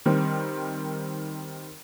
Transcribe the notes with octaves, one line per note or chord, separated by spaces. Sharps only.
D#3 G3 C4